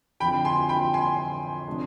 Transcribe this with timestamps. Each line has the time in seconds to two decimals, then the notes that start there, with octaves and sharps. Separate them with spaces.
0.20 F2 D3 F3 G5 B5
0.45 G#5 C6
0.69 G5 B5
0.94 G#5 C6
1.67 C3 F3 G#3 D4